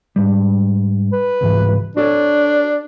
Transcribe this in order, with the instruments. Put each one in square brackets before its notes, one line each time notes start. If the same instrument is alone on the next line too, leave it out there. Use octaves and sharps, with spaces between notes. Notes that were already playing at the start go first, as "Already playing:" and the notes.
[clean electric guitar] G#2 G3
[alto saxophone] B4
[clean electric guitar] C#2 G#2 E3
[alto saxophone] D4 [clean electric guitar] F#4 A4 C#5